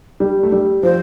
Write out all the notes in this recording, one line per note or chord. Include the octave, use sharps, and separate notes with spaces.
G3
A3
G3
F3 C5